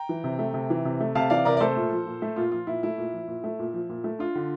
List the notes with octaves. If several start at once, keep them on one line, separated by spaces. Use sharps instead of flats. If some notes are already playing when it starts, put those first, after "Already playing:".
Already playing: G5 A#5
E3
C3
A3
C3
E3
C3
A3
C3 F5 A5
E3 D5 F5
C3 A#4 D5
D5
A3 A4 C5
A#2
F3
A#2
A3
A#2 F4
F3 F4
A#2 E4
A3 E4
A#2
F3
A#2
A3
A#2
F3
A#2
A3
D4 F4
D3